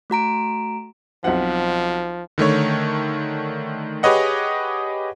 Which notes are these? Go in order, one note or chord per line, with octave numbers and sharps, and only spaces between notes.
A3 F#4 A#5 D7
B1 F3 C4 F#5
D3 D#3 A3 C#5
G4 G#4 B4 C#5 D#5 F#5